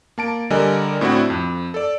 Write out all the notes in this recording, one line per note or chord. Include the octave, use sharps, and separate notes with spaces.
A#3 A5 D7
D3 G3 A#4 D5 D#5 G#5
A2 C4 D4 E4 F#4
F2
A4 D5